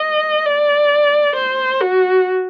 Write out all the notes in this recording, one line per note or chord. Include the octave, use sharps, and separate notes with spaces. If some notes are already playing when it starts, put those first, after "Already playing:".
Already playing: D#5
D5
C5
F#4